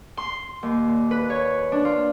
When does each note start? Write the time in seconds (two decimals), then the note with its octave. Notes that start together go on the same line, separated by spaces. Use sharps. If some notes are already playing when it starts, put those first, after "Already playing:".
0.17 C6
0.63 D#2
0.87 A#2
1.11 B4
1.30 C#5
1.72 D4
1.85 F4